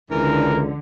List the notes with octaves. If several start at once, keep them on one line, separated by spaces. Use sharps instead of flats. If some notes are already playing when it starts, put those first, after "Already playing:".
C#2 D3 E3 A#4